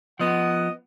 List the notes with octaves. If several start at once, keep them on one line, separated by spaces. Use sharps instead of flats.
F3 B3 D#5 F#5